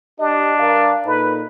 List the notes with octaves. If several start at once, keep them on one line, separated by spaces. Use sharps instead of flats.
D4 G4 D#5
G2 A#4 F5
A#2 D#4 A4 B4